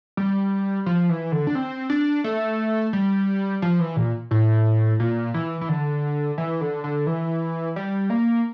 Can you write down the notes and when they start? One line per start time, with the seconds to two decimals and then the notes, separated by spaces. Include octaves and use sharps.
0.17 G3
0.86 F3
1.09 E3
1.32 D3
1.47 D4
1.55 C4
1.90 D4
2.24 A3
2.93 G3
3.62 F3
3.79 E3
3.96 A#2
4.31 A2
5.00 A#2
5.34 E3
5.61 E3
5.69 D3
6.38 E3
6.61 D3
6.84 D3
7.07 E3
7.76 G3
8.10 A#3